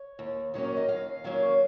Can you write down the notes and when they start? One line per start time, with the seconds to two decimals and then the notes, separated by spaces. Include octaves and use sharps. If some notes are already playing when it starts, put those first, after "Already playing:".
Already playing: C#5
0.19 D#2
0.54 D#3 F#3 A#3 C#4
0.77 D#5
0.89 D#2 F5
1.24 D#3 F#3 A#3 C#4 F5